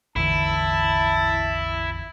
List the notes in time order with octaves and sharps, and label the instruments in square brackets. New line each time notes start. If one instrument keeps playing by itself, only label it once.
[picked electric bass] A1 E2 D3 [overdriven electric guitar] E4 [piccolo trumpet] A5